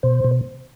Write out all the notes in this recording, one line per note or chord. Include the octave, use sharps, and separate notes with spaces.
B2 C5
B2